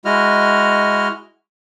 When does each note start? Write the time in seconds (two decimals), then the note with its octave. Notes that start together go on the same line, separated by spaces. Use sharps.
0.05 G#3 E4 F#4 D#5 F6